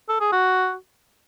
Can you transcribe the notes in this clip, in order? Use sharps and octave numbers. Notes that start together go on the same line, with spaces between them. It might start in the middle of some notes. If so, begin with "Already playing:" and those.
A4
G#4
F#4